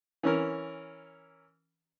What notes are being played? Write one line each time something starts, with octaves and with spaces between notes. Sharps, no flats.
E3 C#4 A#4